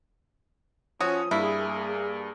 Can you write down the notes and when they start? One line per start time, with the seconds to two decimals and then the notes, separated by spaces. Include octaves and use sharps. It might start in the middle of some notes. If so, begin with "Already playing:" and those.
1.00 F3 C#4 F#4 C#5 D#6
1.31 G2 A#3 E4 G#4